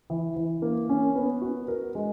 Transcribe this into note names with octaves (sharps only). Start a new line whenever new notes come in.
E3
E3
A#3
C#4
B3
F#4
A#4
G#3